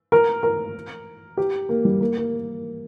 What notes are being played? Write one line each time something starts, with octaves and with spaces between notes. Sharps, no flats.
A#4
A#4
G4
A#3
G3
A#3
A#3